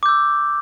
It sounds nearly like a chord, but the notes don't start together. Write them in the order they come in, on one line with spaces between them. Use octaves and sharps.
D6 G6 E6